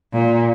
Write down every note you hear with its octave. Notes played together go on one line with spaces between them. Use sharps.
A#2